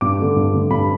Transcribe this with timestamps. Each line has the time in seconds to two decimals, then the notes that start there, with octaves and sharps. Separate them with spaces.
0.01 G2 D6
0.19 D3 A3
0.36 G2
0.54 D3 A3
0.70 G2 B5